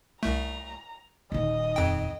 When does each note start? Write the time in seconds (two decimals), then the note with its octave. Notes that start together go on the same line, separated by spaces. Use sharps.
0.23 C2 A3 A#5
1.32 D#1 D#3 D#5
1.76 F2 G5